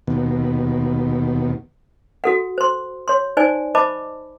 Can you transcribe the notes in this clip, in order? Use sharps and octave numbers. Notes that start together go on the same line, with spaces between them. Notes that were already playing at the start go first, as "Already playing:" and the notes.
D#2 B2
F#4 A4 F#5
C5 C6
C#5 C6
D#4 C5 D5 G#5
C5 D#5 A5 B5 D6